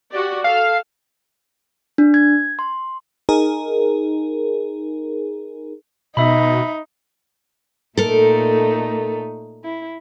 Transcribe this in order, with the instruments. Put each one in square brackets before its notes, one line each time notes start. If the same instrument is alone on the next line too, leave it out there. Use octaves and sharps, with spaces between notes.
[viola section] F#4 G4 D5
[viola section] A4 [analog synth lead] F5
[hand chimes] D4
G#6
C6
[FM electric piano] D#4 G#4 A#4
[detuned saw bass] B2 [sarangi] D#4 [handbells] E5 B5
[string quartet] A#2 A3 D#4 [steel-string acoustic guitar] A4 A#4
[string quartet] E4